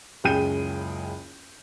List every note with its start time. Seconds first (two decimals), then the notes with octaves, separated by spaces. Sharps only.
0.24 F#1 C#2 G#4 G5 G6 D#7